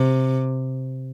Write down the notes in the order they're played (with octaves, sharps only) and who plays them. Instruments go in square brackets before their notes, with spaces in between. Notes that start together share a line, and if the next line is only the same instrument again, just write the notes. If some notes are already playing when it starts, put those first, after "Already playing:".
Already playing: [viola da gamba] C3